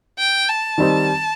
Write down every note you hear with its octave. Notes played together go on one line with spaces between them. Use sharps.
G5
A5
D#3 G3 C4 D#4